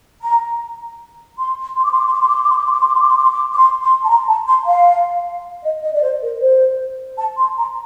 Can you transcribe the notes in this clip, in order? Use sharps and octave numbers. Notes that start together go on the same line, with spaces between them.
A#5
C6
C6
D6
C6
D6
C6
D6
C6
D6
C6
D6
C6
D6
C6
D6
C6
D6
C6
D6
C6
D6
C6
D6
D6
C6
C6
A5
A#5
A5
C6
F5
D#5
D#5
D5
C5
A#4
C5
A5
C6
A#5